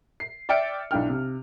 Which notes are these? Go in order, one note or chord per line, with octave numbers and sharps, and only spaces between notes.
C7
D5 E5 G5 F6 C#7 D7
B1 D4 E4 G5 F6
C3